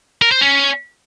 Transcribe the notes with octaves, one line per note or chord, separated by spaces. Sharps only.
A#4
C5
C#4